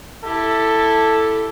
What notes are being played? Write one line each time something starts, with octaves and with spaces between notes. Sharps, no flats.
E4 G4 A4